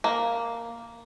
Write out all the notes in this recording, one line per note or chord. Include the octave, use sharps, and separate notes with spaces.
A#3